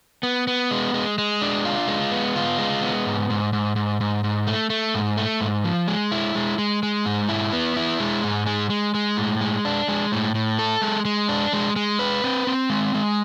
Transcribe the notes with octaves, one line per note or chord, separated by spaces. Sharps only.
B3
B3
G#3
G#3
G#3
D4
F4
G#3
B3
F4
G#3
B3
G#2
G#2
G#2
G#2
G#2
G#2
A3
A3
G#2
A3
G#2
F3
G#3
E4
G#3
G#3
G#3
G#2
E4
B3
E4
G#3
G#2
G#3
G#3
G#3
A2
G#3
D4
G#3
A2
A2
A4
G#3
G#3
D4
G#3
G#3
B4
C4
C4
G#3
G#3